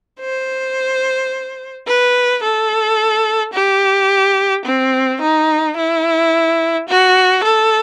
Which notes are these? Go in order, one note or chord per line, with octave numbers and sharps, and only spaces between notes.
C5
B4
A4
G4
C4
D#4
E4
F#4
A4